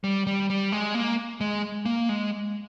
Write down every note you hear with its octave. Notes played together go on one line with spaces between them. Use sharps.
G3
G3
G3
G#3
A#3
G#3
A#3
G#3